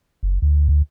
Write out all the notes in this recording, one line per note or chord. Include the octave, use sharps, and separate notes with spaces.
F#1
D2
D2